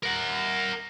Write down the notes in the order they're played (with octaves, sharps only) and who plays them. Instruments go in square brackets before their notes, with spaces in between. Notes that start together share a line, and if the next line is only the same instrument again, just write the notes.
[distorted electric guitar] A#4 F#5